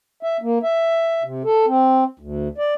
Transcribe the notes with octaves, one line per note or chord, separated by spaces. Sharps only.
E5
A#3
E5
C3
A4
C4
D2
D5